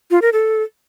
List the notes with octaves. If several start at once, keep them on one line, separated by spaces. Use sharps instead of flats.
F4
A#4
A4